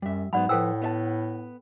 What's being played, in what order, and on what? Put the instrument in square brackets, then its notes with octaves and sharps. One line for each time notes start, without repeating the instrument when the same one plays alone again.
[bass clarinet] F#2 [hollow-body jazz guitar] G3 E5
[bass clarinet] G#2 [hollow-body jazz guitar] F#3 G#3 B3 [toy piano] D5 F#5 B5
[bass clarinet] A2 [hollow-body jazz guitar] F3 B4 C5 [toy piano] A4 G5 E6
[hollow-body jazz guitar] B3 E5 A5